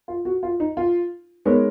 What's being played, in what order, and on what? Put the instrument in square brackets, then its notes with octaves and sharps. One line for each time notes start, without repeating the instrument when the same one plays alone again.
[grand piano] F4
F#4
F4
D#4
F4
[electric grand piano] G#3 D#4 A#4 C#5 [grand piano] B3